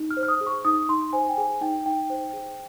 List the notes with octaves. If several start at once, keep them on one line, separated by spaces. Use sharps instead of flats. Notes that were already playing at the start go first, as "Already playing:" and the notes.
Already playing: D#4
F6
C5
F6
D#6
G#4
C#6
D#4 D#6
D#4 C6
C5 G#5
G5
G#4 G#5
D#4 G5
D#4 G5
C5
G#4